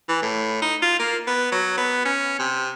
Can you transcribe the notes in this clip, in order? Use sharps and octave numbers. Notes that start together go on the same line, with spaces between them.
E3
A2
D#4
F4
A#3
B3
F#3
B3
C#4
C3